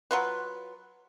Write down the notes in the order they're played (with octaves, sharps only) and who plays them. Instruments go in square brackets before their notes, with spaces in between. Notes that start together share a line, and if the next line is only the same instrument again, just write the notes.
[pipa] F#3 F4 B4